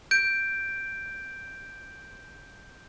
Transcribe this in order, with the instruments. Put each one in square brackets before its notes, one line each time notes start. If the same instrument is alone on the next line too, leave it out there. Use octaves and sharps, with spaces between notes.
[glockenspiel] G6 D7